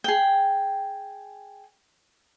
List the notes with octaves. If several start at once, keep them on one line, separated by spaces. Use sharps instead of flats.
G#4 G5